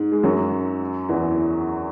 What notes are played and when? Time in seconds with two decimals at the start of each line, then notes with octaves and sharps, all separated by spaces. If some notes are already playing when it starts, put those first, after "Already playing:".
Already playing: G#2
0.12 G#3
0.23 F#2 F#3
1.09 E2 E3